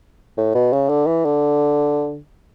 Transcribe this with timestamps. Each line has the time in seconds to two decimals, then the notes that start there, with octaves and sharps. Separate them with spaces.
0.37 A2
0.55 B2
0.73 C#3
0.89 D3
1.07 E3
1.25 D3